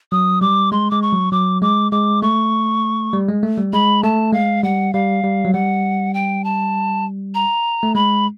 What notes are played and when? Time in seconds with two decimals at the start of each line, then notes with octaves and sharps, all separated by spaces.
0.12 F#3 D#6
0.41 G3 D6
0.72 G#3 C6
0.91 G#3 D6
1.02 C#6
1.13 F#3
1.32 F#3 D6
1.62 G#3 D6
1.92 G#3 D6
2.22 A3 C#6
3.13 G3
3.28 G#3
3.43 A3
3.58 G3
3.73 G#3 B5
4.03 A3 A5
4.33 G#3 F5
4.63 G3 F#5
4.93 G3 F5
5.23 G3
5.45 F#3
5.53 G3 F#5
6.14 G5
6.44 A5
7.35 A#5
7.83 A3
7.95 G#3 B5